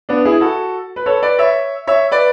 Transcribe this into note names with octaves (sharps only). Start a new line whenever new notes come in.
B3 D4
E4 G#4
F#4 A4
B4
A4 C#5
B4 D5
C#5 E5
C#5 E5
B4 D5